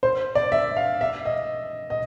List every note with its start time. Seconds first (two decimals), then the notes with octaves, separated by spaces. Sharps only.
0.03 C5
0.35 D5
0.52 E5
0.77 F5
1.01 E5
1.25 D#5
1.90 D#5